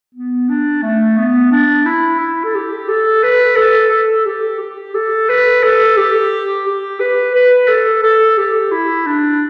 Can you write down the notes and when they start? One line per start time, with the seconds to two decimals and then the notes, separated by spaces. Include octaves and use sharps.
0.15 B3
0.49 D4
0.83 A3
1.18 B3
1.51 D4
1.86 E4
2.20 E4
2.44 A4
2.55 G4
2.88 A4
3.23 B4
3.57 A4
3.91 A4
4.26 G4
4.60 G4
4.94 A4
5.29 B4
5.63 A4
5.97 G4
6.65 G4
7.00 B4
7.35 B4
7.68 A4
8.03 A4
8.38 G4
8.71 E4
9.06 D4